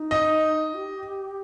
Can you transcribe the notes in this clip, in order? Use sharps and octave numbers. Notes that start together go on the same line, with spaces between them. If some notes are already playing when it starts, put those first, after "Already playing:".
Already playing: D#4
D#5
G4